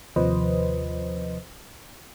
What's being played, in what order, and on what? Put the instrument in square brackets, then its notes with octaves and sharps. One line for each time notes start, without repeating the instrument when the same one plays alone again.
[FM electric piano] D#2 C3 F3 B4 C5 D#5